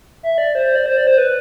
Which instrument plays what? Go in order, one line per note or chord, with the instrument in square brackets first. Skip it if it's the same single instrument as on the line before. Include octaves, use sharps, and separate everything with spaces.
[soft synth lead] E5
D5
C5
C5
D5
C5
D5
C5
B4